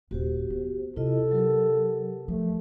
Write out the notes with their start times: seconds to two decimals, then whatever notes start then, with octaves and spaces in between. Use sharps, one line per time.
0.11 D#1 F#4 G4 C5
0.50 B3
0.96 C3 E4 F4 A4 D#5
1.31 F#3 G4 A#4
2.28 F3 A3